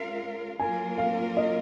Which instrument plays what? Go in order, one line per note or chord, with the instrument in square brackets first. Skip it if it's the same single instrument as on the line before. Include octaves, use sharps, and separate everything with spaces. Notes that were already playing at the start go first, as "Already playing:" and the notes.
Already playing: [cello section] G#3 C#4 F4 A#4 F5
[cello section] F#3 A#3 F4 A#4 [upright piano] G#5
[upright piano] F5
D#5